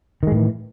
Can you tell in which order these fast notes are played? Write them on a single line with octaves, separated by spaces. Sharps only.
D#3 G#3 A2 E3